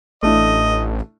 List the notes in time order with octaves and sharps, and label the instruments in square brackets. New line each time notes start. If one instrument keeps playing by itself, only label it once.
[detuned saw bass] A1 [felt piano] A3 D4 E4 [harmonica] D#5